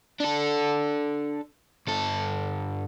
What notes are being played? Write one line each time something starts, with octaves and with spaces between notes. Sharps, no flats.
D4 A4
G2 A4